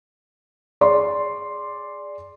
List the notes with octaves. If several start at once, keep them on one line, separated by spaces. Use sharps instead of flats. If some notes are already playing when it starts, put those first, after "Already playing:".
G#4 D5 C6